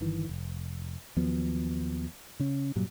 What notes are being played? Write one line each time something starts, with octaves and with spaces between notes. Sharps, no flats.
G1 D#3 E3
F1
D#2 F3 F#3 B3
C#3 C#4
G2 A#2 F#3 G3